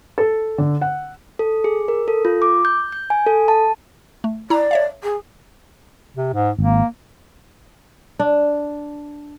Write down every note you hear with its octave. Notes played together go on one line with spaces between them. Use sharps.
A4
D3
F#5
A4
G#4
A#4
A4
F4
D6
G6
G6
G#5
A4
A5
A3
E4 D5 A#5
C#5 E5 F5
G#4
C3
G#2
G#1 A#3
D4